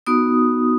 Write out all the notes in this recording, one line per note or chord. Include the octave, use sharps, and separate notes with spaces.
B3 D#4 F#4 D#6